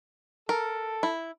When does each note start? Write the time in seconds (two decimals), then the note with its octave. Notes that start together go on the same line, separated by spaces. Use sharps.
0.49 A4 A#4
1.03 E4